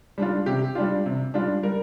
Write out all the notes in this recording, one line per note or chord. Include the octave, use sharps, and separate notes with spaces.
G3 D4 F4
C3 G4
G3 D4 F4
C3
G3 D4 F4
G3 A#4